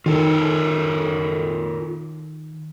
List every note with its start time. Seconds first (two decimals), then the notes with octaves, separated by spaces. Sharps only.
0.06 D#3 F4 A4 A#4